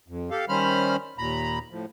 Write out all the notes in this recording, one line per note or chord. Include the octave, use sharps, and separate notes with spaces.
F2
G4 A4 F5
D#3 G3 C#4 C5 B5 F6
D#2 A#2 A#5 B5
A2 F3